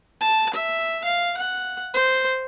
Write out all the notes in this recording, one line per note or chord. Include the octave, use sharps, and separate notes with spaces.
A5
E5
F5
F#5
C5